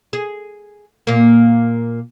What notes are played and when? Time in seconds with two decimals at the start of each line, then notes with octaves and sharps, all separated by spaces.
0.13 G#4
1.07 A#2 A#3